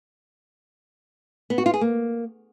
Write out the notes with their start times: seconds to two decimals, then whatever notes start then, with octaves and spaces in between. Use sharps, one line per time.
1.50 B3
1.58 F#4
1.66 F4
1.74 G#4
1.81 A#3